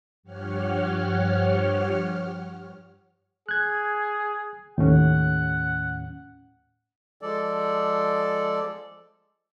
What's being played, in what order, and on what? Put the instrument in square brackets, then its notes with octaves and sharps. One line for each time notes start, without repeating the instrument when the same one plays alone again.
[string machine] G2 F3 G4 C#5 F#5 F6
[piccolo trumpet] G#4 [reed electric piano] F#6 G#6
[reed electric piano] D#2 A2 C#4 [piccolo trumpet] F#5
[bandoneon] F3 G#3 A4 D5